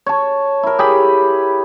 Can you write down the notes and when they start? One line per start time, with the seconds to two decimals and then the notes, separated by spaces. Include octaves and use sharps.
0.06 C#5 A5
0.63 E4 A#4
0.79 G4 G#4 B5